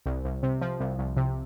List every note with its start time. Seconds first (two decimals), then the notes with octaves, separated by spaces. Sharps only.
0.06 C2
0.25 C2
0.43 C3
0.61 F3
0.80 C2
0.99 C2
1.17 C3